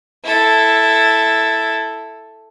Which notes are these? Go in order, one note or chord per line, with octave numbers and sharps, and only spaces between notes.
E4 A4